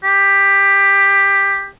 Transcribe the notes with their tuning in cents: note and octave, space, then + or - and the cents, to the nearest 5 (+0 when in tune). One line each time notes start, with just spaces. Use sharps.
G4 +15